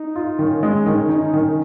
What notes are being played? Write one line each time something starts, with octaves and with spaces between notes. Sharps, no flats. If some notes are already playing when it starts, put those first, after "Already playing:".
Already playing: D#4
F4
D#3 C#4
G#3
D#3
D#4
D#3